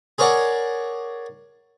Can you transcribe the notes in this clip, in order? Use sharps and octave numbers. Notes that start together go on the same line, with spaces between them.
G#4 A#4 C#5 D5 F#5